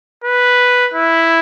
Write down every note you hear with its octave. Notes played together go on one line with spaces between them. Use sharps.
B4
E4